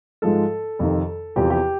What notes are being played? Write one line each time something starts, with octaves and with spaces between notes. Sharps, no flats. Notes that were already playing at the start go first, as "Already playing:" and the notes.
G#2 F3 G#3 A4
F2 C3 D#3
E2 C3 F3 G4
G4